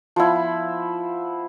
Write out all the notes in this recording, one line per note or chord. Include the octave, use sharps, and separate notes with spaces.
F3 B3 E4